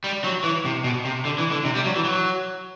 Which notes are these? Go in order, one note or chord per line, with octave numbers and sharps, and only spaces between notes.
G3
F#3
E3
C3
B2
C3
D3
E3
D3
C3
G3
F#3
E3
F#3